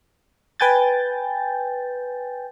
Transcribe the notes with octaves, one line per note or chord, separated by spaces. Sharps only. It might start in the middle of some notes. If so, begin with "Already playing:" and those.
B4 G5 G#5 G6 A6